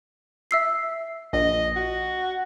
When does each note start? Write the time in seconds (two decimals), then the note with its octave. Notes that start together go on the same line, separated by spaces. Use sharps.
0.51 E5 E6 C7
1.33 A#1 D#5
1.76 F#4